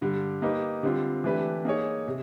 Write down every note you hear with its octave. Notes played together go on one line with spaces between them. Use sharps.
G2 D3 G3
A#3 D#4 G4 B4
D3 G3 C4 F4
E3 A3 D4 G4 B4
A#3 D#4 G#4 C#5
C3